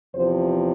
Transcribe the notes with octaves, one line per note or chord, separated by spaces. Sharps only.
E2 C3 F3 C5